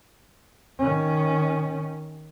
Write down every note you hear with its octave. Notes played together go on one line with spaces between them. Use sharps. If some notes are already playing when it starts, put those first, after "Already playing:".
D#3 C#4